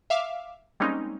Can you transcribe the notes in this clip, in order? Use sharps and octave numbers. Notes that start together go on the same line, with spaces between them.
E5 F5 D6
G3 G#3 A#3 C4 C#4 D#4